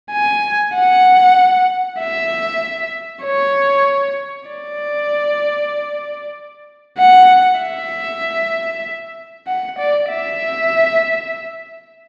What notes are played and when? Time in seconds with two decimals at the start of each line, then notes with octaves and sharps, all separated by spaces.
0.12 G#5
0.74 F#5
1.99 E5
3.24 C#5
4.49 D5
6.99 F#5
7.60 E5
9.47 F#5
9.79 D5
10.10 E5